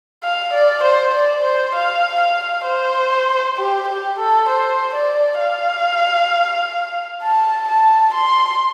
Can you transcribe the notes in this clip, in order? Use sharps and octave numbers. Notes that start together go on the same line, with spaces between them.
F5
D5
C5
D5
C5
F5
F5
C5
G4
G4
A4
C5
D5
F5
A5
A5
C6